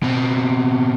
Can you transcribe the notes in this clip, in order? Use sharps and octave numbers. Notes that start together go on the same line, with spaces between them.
B2 C4